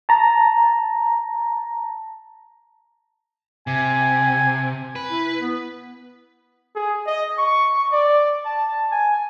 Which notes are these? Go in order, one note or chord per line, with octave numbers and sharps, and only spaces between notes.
A5 A#5
C3 G#5
B4
E4
B3
G#4
D#5
C#6
D5
A5
G#5